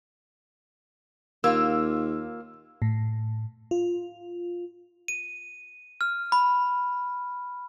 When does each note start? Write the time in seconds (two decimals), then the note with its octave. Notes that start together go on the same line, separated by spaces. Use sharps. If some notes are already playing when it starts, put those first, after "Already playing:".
1.44 D#2 A#3 F4 E6
2.82 A2
3.71 F4
5.08 D#7
6.01 F6
6.32 B5